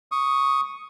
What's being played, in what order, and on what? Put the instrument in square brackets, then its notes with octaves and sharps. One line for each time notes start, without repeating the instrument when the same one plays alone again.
[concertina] C#6 D#6